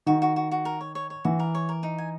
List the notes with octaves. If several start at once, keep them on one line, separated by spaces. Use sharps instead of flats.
D#3 F#4
F#4
F#4
F#4
A#4
C#5
C#5
C#5
E3 F#4
A#4
C#5
A#4
D#4
G#5